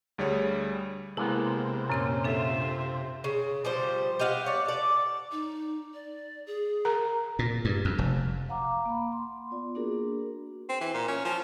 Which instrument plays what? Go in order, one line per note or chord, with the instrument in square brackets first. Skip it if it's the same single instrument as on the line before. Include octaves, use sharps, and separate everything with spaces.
[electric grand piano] D2 G3 G#4 C#5
[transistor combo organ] C3 [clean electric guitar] G#3 A#3 B3 [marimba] E4
[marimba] F#2 C4 C6 [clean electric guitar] A#2 C#4
[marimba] D4 A4 [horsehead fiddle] F4 E5
[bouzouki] C#3
F3 G3 C5
G4 D#5 F5 F#5
C#5 D5
A4 D5
[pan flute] D#4
D5
G#4
[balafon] A#4 A#5
[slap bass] A#2
G2
F2
F1
[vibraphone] F5 F#5 A#5 D6
A#3 B5
C6
B3 F4 D5
A#3 D4 F#4 G#4 A#4
[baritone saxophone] C4
E3
A#2
C#4
F3